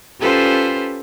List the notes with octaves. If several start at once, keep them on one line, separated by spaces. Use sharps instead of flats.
C#4 F4 G4 A4 B4 C5